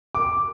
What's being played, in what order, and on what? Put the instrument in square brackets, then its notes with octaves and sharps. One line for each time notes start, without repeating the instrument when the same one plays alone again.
[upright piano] D6